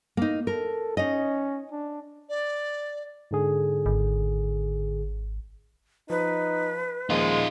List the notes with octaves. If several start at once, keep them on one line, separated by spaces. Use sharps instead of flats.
A#3 D#4
A4 A#4
C#4 D#4 D#5
D4
D5
G#2 D3 G#4
G#1
F3 D#4 B4
D#2 A#2 F3 G#3 D#4 F4